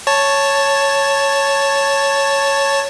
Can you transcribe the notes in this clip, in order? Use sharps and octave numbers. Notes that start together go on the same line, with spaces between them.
C#5 A5